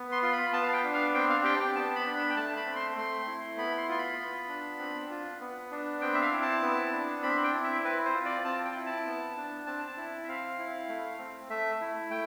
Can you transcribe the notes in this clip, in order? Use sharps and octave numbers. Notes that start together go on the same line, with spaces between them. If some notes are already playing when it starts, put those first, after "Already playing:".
Already playing: B3
C6
F4 C6
B5
B3 A5
F5
G5
D4
F5
C4 G5
F5
G4 G5
G5
B3 A5
B5
D4
B5
G5
A3 A5
B5
C4
C6
A3 C6
E4
B3 B5
C6
F4 C6
B5
B3
D4
C4
F4
B3
D4
C4 G5
E5
F5
E4
A5
B3
D4
C4 B5
G5
E4
E5
C4 B4
C5
F4
D5
C4 A5
G5
E4
A5
B3
D4
C4 A5
A5
E4
E5
C4 F5
E4
A3
C4
A3 E5
E4
A3 G5